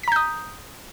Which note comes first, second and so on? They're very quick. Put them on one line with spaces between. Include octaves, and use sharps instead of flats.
B6 A#5 G6 D#6